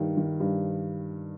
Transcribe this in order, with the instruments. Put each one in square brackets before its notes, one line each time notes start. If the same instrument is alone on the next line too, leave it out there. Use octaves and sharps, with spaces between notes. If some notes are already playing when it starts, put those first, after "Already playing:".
Already playing: [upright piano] G2 D#3
D#3
G2